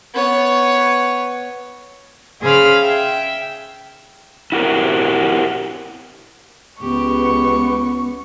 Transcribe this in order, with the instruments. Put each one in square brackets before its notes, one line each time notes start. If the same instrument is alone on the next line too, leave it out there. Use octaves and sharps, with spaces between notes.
[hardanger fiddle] B3 C#5
[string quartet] C#3 G#4 C5 F5 B5 F6
E5 G5
[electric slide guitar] E4 F#4 G4 A#4
[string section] C#2 [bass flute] B3 [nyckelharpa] G4 [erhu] C#6